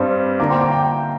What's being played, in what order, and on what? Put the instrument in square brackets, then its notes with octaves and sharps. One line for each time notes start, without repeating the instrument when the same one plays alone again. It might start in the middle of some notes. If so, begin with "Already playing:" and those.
Already playing: [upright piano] G2 G3 C4
D3 A#3 D4 A#5 D6
G5 C6
A#5 D6
G5
G5